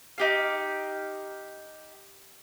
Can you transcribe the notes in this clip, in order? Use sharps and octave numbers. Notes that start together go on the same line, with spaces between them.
D#4 G4 F5